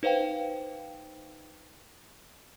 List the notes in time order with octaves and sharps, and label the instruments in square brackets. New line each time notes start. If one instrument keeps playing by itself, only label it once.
[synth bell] D#4 B4 C5 F5 G5